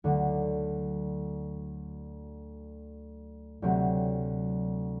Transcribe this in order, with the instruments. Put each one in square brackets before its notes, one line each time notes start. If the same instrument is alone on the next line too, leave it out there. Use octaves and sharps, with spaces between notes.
[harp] D2 D3 F#3
D2 C3 F#3 C4